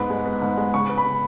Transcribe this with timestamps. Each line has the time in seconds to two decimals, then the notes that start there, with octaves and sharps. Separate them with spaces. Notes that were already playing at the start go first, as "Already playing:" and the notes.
Already playing: G#2 B3 B5
0.10 G#3
0.26 B3
0.42 G#2
0.57 G#3
0.74 C#3 C#6
0.89 B3
0.98 B5
1.05 C#3